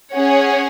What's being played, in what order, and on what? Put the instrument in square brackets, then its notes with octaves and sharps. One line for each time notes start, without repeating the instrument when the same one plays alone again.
[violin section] C#4 G#4 C#5 F#5